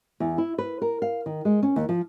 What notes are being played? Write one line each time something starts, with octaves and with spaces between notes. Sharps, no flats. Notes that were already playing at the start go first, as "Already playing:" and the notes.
E2
E4
B4
A#4
F5
D#3
G#3
C#4
D#2
F3